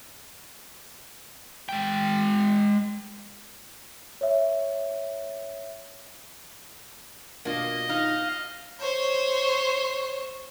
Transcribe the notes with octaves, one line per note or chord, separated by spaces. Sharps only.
G#3 G5
C#5 E5
B2 A#3 D4 F4 D#5
D#4 F5
C5 C#5